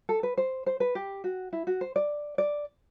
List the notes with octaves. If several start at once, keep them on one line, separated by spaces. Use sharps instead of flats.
A4
B4
C5
C5
B4
G4
F#4
E4
F#4
C5
D5
D5